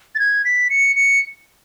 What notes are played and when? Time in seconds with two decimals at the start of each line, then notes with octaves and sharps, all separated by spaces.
0.15 A6
0.19 G#6
0.45 B6
0.70 C#7
0.96 C#7